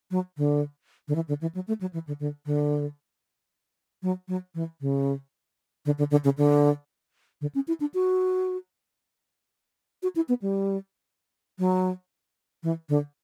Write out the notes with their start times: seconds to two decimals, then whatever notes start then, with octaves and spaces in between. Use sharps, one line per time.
0.11 F#3
0.38 D3
1.08 D3
1.15 E3
1.28 D3
1.41 E3
1.55 F#3
1.68 A3
1.81 F#3
1.93 E3
2.07 D3
2.20 D3
2.46 D3
4.03 F#3
4.28 F#3
4.55 E3
4.81 C#3
5.86 D3
5.98 D3
6.11 D3
6.24 C#3
6.38 D3
7.41 D3
7.55 C#4
7.68 E4
7.80 D4
7.94 F#4
10.03 F#4
10.16 E4
10.29 B3
10.42 G3
11.59 F#3
12.63 E3
12.89 D3